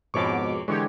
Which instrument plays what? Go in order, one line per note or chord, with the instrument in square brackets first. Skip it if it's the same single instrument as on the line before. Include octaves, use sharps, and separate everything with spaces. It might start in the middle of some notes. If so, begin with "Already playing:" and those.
[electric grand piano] F2 C#5 C#6 [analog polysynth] G#2 B2 D6
[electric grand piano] D3 E3 G#3 [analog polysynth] G4 C#5